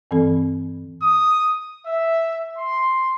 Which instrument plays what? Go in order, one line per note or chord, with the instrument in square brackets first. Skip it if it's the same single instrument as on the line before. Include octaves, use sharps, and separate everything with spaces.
[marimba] G2 E3 C4 A4
[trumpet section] D#6
E5
C6